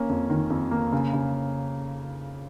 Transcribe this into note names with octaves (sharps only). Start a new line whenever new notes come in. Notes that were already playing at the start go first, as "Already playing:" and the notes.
Already playing: A#3 C#4
F2
D#3
F2
A#3
C#3
C#3